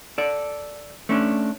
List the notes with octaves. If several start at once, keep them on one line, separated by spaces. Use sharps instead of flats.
A4 D5
A3 C#4 D4